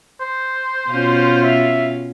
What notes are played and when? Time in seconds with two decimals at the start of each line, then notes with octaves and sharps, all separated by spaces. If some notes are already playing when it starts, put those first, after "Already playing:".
0.21 C5
0.89 B2 C#4 F4
1.43 E5